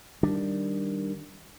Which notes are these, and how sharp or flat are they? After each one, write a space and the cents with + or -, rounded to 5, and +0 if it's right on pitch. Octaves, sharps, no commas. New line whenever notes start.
D#3 +0 G3 +0 D4 +0